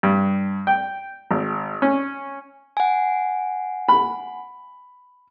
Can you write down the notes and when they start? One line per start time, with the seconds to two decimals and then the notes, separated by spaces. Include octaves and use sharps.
0.03 G2
0.67 G5
1.31 G#1
1.82 C#4
2.77 F#5 G#5
3.89 B5